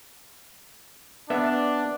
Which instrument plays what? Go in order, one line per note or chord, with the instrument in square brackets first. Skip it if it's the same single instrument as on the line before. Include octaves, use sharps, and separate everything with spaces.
[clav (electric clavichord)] B3 E5 [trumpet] D4